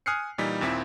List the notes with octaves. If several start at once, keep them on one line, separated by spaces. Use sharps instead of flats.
G#5 D#6 F6 F#6 C7 C#7
A#2 E3 G3 D#4 B6
D#2 A#2 C4 E4 B6